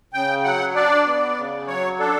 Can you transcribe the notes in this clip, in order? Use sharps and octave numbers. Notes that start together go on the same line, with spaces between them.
C#3 G5
F#3 F#5
D4 D5
B3
C#3
F#3 C#5
D4 A4